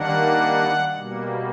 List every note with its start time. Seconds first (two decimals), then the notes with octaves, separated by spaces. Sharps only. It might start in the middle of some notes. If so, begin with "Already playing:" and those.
Already playing: D#3 G3 A#3 D4 F#5
0.91 B2 G3 A#3